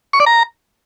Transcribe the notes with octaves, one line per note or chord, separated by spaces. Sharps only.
C#6
D5
A#5